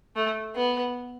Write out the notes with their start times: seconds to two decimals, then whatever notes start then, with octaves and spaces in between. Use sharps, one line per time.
0.16 A3
0.55 B3